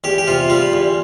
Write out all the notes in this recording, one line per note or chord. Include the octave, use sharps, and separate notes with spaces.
E2 G4
G4
C3 F4
G3 F4
E2